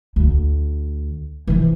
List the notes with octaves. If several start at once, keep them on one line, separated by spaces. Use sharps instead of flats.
D2
E3 F3